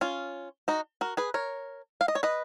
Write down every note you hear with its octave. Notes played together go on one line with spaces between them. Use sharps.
C#4 F4
D#4 F#4
F#4 A#4
G#4 B4
A#4 C#5
F5
D#5
C#5
B4 D#5